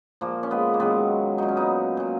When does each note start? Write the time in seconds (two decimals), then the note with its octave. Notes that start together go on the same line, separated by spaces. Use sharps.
0.21 A#2 F3 A#3
0.43 C#4
0.51 G#3 B3
0.74 A#3
0.80 F#2 D#3 F#3 G#3 B3
1.38 A#2 F#3 D#4
1.48 C#4
1.57 B3 D#4
1.97 A#2 F#3